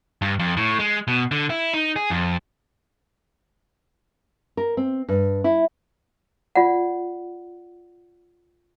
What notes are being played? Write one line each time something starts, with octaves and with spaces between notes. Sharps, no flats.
G2
F2
A2
G#3
B2
D3
E4
D#4
G#4
F2
A#4
C4
G2
E4
F4 D5 F#5